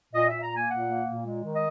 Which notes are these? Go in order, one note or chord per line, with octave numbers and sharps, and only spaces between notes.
A#2 D#5
A#2 E5
A#5
A#3 G#5
A#2 F#5
A#3
A#2
G#3
D#3
D#5